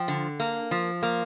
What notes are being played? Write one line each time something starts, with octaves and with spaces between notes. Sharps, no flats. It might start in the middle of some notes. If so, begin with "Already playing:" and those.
Already playing: F3 G5
D3
A#3
F3
A#3